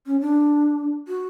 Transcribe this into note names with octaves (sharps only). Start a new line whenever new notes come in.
C#4
D4
F#4